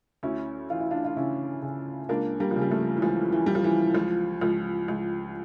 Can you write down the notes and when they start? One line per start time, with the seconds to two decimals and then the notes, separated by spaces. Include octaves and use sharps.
0.23 D2 C#4 E4
0.70 E3 F4
0.80 E4
0.91 D4 F4
1.04 F4
1.16 C#3 C#4 E4
1.62 C#3
2.09 C#2 A#3 D4
2.40 G3 A#3
2.51 C#3 F3
2.62 G3
2.71 F3 A3
2.97 E3
3.02 C#2 F3
3.33 E3
3.46 E3 G3
3.55 F3
3.64 E3
3.94 C#2 F3
4.41 C#2 F3
4.88 C#2